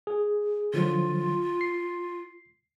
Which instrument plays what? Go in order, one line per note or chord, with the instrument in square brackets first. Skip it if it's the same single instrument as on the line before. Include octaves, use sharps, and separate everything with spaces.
[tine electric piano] G#4
[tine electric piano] D3 F3 F#3 [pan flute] F4
[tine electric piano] C7